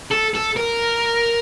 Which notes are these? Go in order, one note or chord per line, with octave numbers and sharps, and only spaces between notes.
A4
A4
A#4